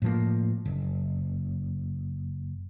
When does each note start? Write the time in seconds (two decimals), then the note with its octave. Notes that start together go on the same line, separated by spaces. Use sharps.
0.02 A2 F3 A#3
0.65 F#1